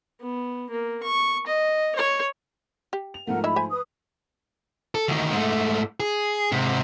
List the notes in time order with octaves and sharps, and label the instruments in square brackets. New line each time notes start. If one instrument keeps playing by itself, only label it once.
[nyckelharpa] B3
A#3
C#6
D#5
C#5
[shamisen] G4
[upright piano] F7
[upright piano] G#2 F3 A3 [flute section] A#4 F#5
[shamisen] D#4 E4 E5 [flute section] B5
[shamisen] C5 E5 G#5
[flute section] B4 D#6
[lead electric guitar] A4
D2 D#3
G#2 A3
G#4
G#2 C3